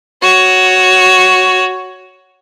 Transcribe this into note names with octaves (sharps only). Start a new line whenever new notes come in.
F#4 C#5